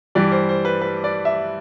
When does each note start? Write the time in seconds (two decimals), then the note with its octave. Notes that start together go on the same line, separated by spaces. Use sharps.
0.15 G2 E3 G3 D5
0.32 C5
0.49 C5
0.65 B4
0.81 B4
1.04 D5
1.25 E5